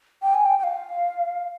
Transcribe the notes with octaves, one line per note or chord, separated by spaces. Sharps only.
G5
G#5
G5
G5
F5